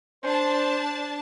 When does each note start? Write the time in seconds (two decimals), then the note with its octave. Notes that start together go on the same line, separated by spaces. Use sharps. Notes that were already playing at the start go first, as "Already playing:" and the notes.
0.23 D4 C5 A5